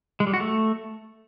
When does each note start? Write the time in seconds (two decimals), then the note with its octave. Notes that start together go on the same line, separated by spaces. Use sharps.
0.20 G#3
0.27 G3
0.34 F#4
0.40 A3